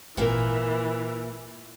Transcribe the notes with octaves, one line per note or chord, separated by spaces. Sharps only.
G#1 A#2 E3 A#3 A#4 E5